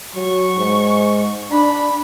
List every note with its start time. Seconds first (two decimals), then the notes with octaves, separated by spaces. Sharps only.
0.15 F#3 C#6
0.58 G#2
1.51 D4 B5